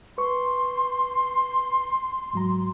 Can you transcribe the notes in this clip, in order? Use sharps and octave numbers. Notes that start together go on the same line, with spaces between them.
B4 C6 C#6
G#2 F#3 A#5